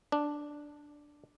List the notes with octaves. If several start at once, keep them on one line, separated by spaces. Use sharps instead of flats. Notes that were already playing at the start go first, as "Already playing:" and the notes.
D4